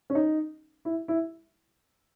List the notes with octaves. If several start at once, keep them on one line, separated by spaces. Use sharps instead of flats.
C#4
D#4
E4
E4